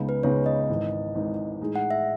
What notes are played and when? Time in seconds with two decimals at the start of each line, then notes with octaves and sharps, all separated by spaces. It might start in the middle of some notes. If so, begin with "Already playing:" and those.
Already playing: C#2 C#3 G#3 B3 D#4
0.09 B4
0.23 C#2 C#3 G#3 B3 D#4 C#5
0.46 D#5
0.69 G#1 G#2 E3
1.15 G#1 G#2 E3
1.60 A2 E3 G#3 D#4 G#4
1.76 F#5
1.91 E5